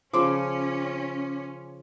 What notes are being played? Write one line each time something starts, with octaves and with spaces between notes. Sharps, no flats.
C#3 F3 C#4 C6 D6